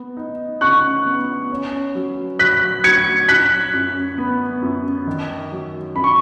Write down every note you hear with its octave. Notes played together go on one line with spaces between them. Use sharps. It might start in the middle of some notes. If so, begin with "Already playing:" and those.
Already playing: B3
D#4
C#3 C#6 F#6
B3
C#4
F#3
F#3 F#6 B6
F#3 G#6 C#7
F#3 F#6 B6
F#2
B3
F#2
D#3
F#3
F#2 B5
C#6